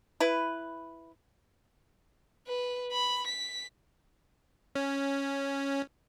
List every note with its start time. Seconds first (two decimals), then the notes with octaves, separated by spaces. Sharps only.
0.20 E4 B4
2.48 B4
2.93 B5
3.27 B6
4.75 C#4